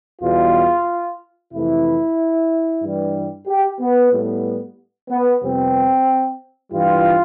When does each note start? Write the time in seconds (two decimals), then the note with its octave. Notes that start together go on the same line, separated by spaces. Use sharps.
0.21 E2 B2 G3 F4
1.52 F2 C3 E3 A3 E4
2.82 G2 E3 G3
3.47 G4
3.80 B3
4.12 A2 G3 B3
5.10 B3
5.42 F2 C3 G3 B3 C4
6.72 G2 E3 G3 F4